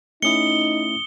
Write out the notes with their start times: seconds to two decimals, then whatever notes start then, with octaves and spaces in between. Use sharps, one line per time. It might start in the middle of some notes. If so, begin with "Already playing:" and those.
0.22 A3 C#4 D#4 E4 D#6 C#7 G7